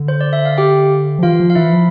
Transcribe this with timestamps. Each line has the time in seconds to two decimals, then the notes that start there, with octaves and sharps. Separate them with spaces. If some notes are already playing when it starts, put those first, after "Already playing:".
Already playing: D3
0.08 C5
0.21 D5
0.33 E5
0.45 F5
0.58 G4 G5
1.19 F3
1.23 E3 F4 F5
1.40 F3
1.50 F5
1.55 E3 E4 E5
1.73 F3